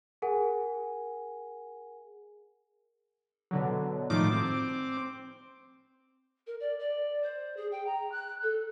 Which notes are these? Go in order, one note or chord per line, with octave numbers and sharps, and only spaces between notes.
G#4 A#4 F#5 G#5
B2 D3 F#3
A2 D#3 F3 D6
C4
A#4
D5
D5
C5
G#4
G5
A#5
F#6
A4